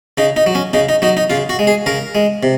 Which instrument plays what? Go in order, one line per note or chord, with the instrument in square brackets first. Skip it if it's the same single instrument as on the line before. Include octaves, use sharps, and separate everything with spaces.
[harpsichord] C#3 D#4
D#4
F#3
C#4
C#3 D#4
D#4
F#3 D#4
D#4
C#3 F4
F#4
G#3
G#4
C#3 A#4
G#3
C3